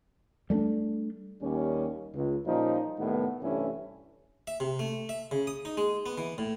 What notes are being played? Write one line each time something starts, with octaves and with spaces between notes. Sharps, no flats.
G3 A3 C#4 D4
D#2 G3 C#4
C#2
A#2 F3 G3 C#4 D#4
C2 A2 D#3 G3 B3
G2 C3 E3 A3 C#4 E4
E5
C3
A3
E5
C#3
D#6
D#4
G#3
B3
E3
A2